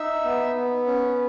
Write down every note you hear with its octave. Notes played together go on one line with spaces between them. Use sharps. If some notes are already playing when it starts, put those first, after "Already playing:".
Already playing: D#4 E5 E6
B3
B3
C#4